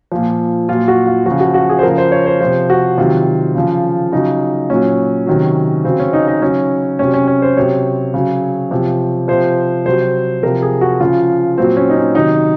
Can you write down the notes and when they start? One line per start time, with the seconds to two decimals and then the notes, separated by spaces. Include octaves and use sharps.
0.12 A#2 F3
0.69 A#2 F#3 F4
0.88 F#4
1.07 F4
1.26 C#3 F3 F#4
1.40 F#4
1.54 F#4
1.69 G#4
1.79 C5
1.83 C#3 F3 A#4
1.98 C5
2.12 C#5
2.26 C5
2.40 C3 F3 C5
2.70 F#4
2.98 C3 D#3 F#3 F4
3.55 C#3 F3
4.12 C#3 F#3 D#4
4.70 A#2 F#3 C#4
5.27 C3 D#3 F#3
5.84 C#3 F#3 C4
5.99 C#4
6.13 D#4
6.27 D#4
6.42 C#3 F#3 C#4
6.99 C3 F#3 C#4
7.14 C#4
7.27 C#4
7.42 C5
7.56 C3 F#3 C#5
8.14 C#3 F#3
8.71 C3 F3
9.28 C3 F3 C5
9.85 C3 F#3 C5
10.43 C3 F3 A#4
10.62 G#4
10.81 F#4
11.00 C#3 F3 F4
11.58 A#2 F#3 C4
11.77 C#4
11.90 D#4
11.96 C#4
12.15 C3 D#3 F#3 D#4